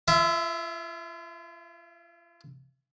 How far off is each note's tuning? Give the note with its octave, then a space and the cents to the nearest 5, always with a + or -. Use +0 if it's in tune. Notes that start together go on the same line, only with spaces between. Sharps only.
F4 -40 E5 +0